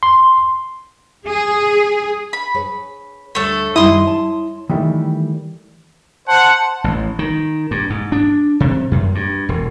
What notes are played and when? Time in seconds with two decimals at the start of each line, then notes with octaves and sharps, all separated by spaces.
0.03 C6
1.27 G#4
2.33 B5
2.54 G#4 B4 C#5
3.35 D2 G3 A3 A4 C#5
3.76 F#2 D#3 G3 E4 C6 D#6
4.06 C#5 A5
4.69 D#3 E3 G3 A3
6.28 C5 F#5 A5
6.84 A1
7.19 D#3
7.71 G2
7.90 G#2
8.12 D4
8.60 C3
8.92 F#2
9.15 G2
9.49 E1